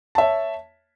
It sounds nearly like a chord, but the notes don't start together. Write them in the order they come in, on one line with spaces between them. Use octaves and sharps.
A5 E5 C#5